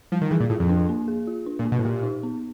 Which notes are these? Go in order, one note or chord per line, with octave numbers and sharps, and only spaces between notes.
F3 G3
D#3
E3 G#4
A#2
A2 F4
F2
D4
A#3
G#4
F4
D4
A#2
A#3
B2
A2
A#2 G4
D#4
B3